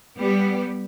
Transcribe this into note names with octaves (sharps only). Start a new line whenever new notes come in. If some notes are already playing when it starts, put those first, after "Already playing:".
G3 B3 G4